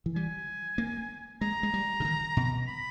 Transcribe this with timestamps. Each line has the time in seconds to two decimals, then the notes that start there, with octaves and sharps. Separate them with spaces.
0.06 E3
0.15 G3 G#5
0.78 A#3
1.41 G#3 A#5
1.63 G#3
1.74 G3
2.00 C#3
2.05 D#3
2.37 B2
2.68 B5